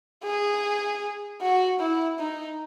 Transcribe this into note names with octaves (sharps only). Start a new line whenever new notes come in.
G#4
F#4
E4
D#4